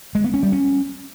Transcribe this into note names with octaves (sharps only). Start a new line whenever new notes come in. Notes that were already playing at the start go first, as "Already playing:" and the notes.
G#3
B3
C#4
G3
C#4